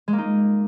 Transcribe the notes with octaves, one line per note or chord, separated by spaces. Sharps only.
G#3
A#3
D#4